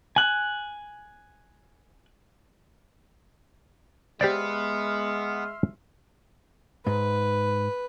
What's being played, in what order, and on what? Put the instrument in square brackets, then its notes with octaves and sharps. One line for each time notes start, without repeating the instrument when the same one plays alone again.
[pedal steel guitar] G#5 F#6
[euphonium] G#3 [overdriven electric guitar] B3 [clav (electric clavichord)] G4 C5 D5 [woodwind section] E5 C6 F6
[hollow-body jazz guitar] G#2 [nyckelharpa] B4